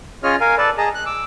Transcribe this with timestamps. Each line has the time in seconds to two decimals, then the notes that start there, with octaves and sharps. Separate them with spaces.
0.24 C#4 F4 G#4 C#5 D#5 F6
0.40 A#4 F5 G#5
0.58 A4 B4 D5 A5
0.78 G#4 D#5 A5 A#5
0.95 F#6
1.06 D6 E6